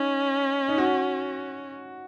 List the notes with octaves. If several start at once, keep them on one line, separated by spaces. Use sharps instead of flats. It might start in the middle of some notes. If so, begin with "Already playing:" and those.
Already playing: C#4 D#4
D#4
F#4